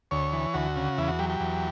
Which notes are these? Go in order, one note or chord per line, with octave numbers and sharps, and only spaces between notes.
D2 C#5
E3
D2 F#4
C#3
E2 E4
F#4
F#3 G4
G4
E2